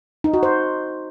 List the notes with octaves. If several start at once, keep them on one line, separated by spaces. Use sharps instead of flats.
D#4
F#4
C5